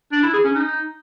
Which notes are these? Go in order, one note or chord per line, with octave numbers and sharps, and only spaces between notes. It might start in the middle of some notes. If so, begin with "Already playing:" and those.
D4
E4
G#4
C#4
D#4